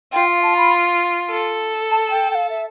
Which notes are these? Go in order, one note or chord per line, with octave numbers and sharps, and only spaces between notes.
F4 G5
F5
A5
B5
A4
A5
G5
G5
F5
E5